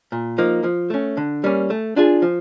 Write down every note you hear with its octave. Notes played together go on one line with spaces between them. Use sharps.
A#2
F3 A#3 D#4
F3
A3 C#4
D3
G3 A#3 C#4
A3
D4 F4 G#4
F3